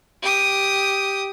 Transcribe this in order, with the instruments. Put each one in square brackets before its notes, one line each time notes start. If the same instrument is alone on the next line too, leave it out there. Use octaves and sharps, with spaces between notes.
[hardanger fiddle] G4 D#6